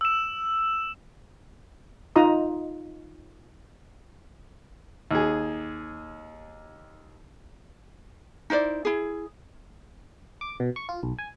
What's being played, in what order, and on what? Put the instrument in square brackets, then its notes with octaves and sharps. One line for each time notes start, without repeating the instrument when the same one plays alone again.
[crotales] E6 E7
[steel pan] D#4 F4 D#5 A#5 D#6
[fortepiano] D#2 G#4
[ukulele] D#4 E4 C5 D5
E4 G#4
[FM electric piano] D6
B2
C#6
F4
B1
G#5